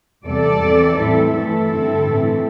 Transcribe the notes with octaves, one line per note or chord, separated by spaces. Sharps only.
E2 C3 G3 A4 D5
E2 E3 C4
A2 E3 G3 C4 E4 A4
G2 E3 A3 E4 A4
G2 D3 C4
A2 E3 A3 C4